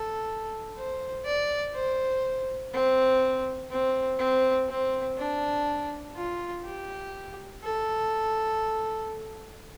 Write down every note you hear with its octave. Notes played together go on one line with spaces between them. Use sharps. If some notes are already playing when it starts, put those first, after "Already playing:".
Already playing: A4
C5
D5
C5
C4
C4
C4
C4
D4
F4
G4
A4